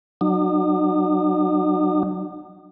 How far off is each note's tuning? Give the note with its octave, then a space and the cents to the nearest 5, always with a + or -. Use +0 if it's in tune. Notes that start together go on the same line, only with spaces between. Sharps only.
F#3 +0 D#4 -45